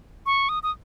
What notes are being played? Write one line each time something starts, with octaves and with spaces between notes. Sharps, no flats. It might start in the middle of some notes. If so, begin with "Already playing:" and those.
C#6
D#6
D#6